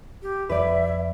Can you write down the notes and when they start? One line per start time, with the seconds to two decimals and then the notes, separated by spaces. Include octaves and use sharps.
0.23 G4
0.49 F2 F3 G3 B4 D5 E5